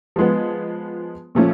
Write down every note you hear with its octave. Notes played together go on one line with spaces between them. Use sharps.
F3 G#3 B3
A#2 F3 A3 C#4